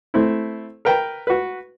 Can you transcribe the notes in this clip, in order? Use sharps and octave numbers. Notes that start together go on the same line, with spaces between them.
A3 C4 E4
A#4 B4 G5 A#5
F#4 B4